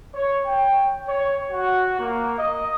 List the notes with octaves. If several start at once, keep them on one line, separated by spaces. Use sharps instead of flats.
C#5
G5
C#5
F#4
A#3
D#5